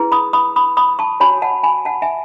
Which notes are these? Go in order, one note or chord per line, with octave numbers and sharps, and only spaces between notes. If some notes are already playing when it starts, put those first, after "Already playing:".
Already playing: E4 G#4 B4
B5 D#6
B5 D#6
B5 D#6
B5 D#6
A5 C#6
F#4 C#5 G#5 B5
F#5 A5
G#5 B5
F#5 A5
E5 G#5